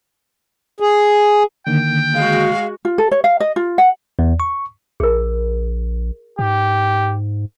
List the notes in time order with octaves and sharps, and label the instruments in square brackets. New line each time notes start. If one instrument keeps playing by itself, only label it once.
[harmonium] G#4
[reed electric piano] D3 D#3 A#3 [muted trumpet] G5
[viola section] G#3 F#4 [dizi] F5
[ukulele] F4
A4
C#5
F5
D#5
F4
F#5
[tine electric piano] E2
C#6
[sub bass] A#1 [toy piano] G#4 A#4
[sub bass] G#2 [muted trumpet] G4